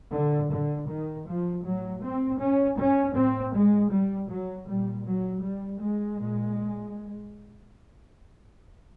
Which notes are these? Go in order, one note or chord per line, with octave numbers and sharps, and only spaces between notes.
A#2 D3
D3
D#3
F3
A2 F#3
C4
C#4
C#4
A2 C4
G#3
G3
F#3
A#2 G3
F#3
G3
G#3
A#2